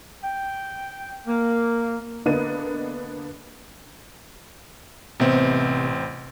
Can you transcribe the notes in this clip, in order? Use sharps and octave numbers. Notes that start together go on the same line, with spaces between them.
G5
A#3
D3 A#3 B3 D4 D#5 D#7
A1 C3 B3 C4